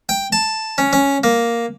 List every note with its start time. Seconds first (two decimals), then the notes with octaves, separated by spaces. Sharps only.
0.09 G5
0.32 A5
0.78 C#4
0.93 C#4
1.24 A#3